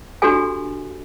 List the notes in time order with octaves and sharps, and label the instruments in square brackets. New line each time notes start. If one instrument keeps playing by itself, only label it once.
[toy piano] D4 F#4 G4 A4 G#5